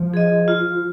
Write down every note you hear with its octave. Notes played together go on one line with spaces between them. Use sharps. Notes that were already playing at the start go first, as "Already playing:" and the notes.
Already playing: F3
G#4 D#5
F4